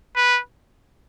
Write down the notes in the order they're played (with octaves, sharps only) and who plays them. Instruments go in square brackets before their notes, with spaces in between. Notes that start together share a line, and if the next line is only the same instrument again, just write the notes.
[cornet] B4